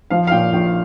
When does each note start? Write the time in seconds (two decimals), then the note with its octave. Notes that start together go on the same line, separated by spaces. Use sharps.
0.10 F3 F5
0.27 F5
0.31 A#2 G5
0.53 A#1 G5